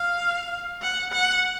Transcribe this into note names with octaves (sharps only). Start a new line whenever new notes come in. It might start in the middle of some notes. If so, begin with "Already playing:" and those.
Already playing: F5
F#5
F#5